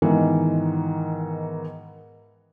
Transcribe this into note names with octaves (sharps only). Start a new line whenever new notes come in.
G#2 B2 D#3 E3